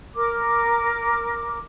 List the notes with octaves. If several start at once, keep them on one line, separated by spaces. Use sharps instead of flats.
A#4 D6